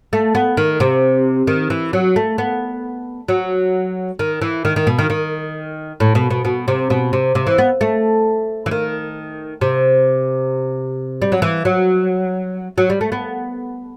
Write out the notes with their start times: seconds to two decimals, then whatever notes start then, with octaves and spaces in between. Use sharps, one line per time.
0.13 A3
0.35 B3
0.57 D#3
0.80 C3
1.47 D#3
1.70 E3
1.93 F#3
2.16 A3
2.38 B3
3.28 F#3
4.19 D#3
4.41 E3
4.65 D#3
4.76 D#3
4.87 B2
4.99 D#3
5.10 D#3
6.00 A2
6.15 B2
6.30 B2
6.45 B2
6.68 C3
6.90 B2
7.13 C3
7.35 C3
7.47 E3
7.58 B3
7.81 A3
8.66 E3
8.71 D#3
9.61 C3
11.22 G3
11.32 F#3
11.42 E3
11.65 F#3
12.78 F#3
12.90 G3
13.01 A3
13.12 B3